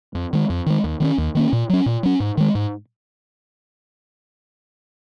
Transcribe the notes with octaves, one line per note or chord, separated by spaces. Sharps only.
F2
D#3 G#3
F2
D#3 G#3
D#2
D#3 A#3 C#4
D#2
D#3 A#3 C#4
A#2
F#3 C#4
A#2
F#3 C#4
G#2
D#3 G#3
G#2